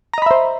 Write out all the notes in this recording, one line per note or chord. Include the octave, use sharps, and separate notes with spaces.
C5 D#5 E5 A#5 B5